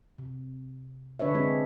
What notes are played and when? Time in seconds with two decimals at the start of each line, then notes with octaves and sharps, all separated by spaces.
0.18 C3
1.19 D3 D4 B4 C#5 E5
1.34 G#3 C4 D4 G#4 C#5